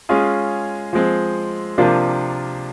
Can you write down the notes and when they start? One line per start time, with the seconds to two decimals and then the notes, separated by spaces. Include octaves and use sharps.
0.09 G#3 C#4 F4 G#4
0.93 F3 G#3 C4
1.78 C3 F3 A#3 D4 F4